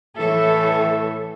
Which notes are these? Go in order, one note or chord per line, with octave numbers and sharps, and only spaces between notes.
A2 E3 A4 C#5 E5